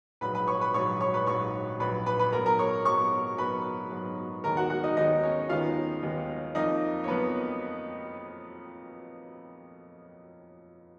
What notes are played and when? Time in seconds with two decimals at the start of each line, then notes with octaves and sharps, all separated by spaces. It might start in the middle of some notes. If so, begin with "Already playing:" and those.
0.21 A#1 G#2 F#3 B4 B5
0.35 B4 B5
0.47 C#5 C#6
0.61 B4 B5
0.74 A#1 G#2 F#3 C#5 C#6
1.01 C#5 C#6
1.14 B4 B5
1.27 A#1 G#2 F#3 C#5 C#6
1.80 A#1 G#2 F#3 B4 B5
2.06 B4 B5
2.19 B4 B5
2.33 G#2 F#3 B3 A#4 A#5
2.46 A#4 A#5
2.59 C#5 C#6
2.85 G#2 F#3 B3 C#5 C#6
3.38 G#2 F#3 B3 B4 B5
3.91 G#2 F#3 B3
4.44 D#2 D#3 G#3 B3 A#4 A#5
4.57 F#4 F#5
4.70 F#4 F#5
4.84 D#4 D#5
4.96 D#2 D#3 G#3 B3 D#4 D#5
5.23 C#4 C#5
5.49 D#2 D#3 G#3 B3 F4 F5
6.02 D#2 D#3 G#3 B3
6.55 F2 F3 A#3 D#4 D#5
7.04 C#5
7.08 F2 F3 A#3 B3 B4